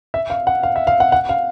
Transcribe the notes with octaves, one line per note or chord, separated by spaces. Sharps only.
E5
F5
F#5
F5
E5
F5
F#5
F#5
F5